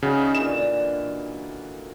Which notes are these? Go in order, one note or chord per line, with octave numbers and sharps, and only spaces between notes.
C#3 C#4 D#4 F#4
A#2 D3 E3 E7